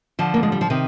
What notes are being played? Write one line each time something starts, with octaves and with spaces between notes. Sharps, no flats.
D3 F3
A#3
G#3
G3
F3
C3 D#3